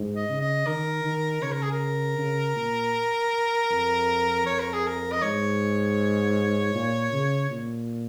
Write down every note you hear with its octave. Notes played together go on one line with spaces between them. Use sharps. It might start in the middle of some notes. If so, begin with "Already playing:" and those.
Already playing: G#2
D#5
C#3
D#5
D#3 A#4
D#3
C#3 C#5
A#4
G#4
A#4
C#3
A#2
F2
F2 C#5
A#4
G#4
A#4
D#5
G#2 C#5
A#2
C#3
A#2